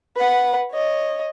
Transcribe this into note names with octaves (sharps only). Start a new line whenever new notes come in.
B4 F#5
C#5 D#5